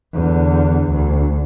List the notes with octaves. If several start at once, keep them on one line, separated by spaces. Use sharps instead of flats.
E2 D3
D2